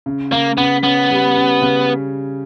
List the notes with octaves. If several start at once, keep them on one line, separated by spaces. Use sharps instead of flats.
C#3
C#3 A#3
C#3 B3
B3 C#4
G3
C#4
C#3